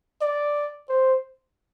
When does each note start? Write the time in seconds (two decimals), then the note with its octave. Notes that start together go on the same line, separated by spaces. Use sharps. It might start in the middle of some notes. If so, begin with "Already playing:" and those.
0.22 D5
0.89 C5